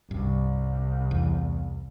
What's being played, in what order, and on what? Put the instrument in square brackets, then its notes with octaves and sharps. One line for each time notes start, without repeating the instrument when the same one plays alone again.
[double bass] C2 [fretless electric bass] G2
[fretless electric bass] E2